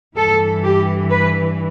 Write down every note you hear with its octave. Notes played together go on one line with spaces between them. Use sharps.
G2 E3 A4
G4
B4